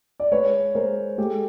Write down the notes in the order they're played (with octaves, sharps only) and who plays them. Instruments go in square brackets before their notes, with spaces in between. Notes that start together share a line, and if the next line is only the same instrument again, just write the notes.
[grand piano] D5
G#3 B4 C#5
G#3 A#4 C5
G#3 G4 A4